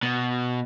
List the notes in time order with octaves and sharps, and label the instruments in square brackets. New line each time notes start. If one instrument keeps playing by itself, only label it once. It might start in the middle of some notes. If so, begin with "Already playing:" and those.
[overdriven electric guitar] B2